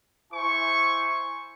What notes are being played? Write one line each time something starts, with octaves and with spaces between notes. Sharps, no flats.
E4 C5 G#5 C#6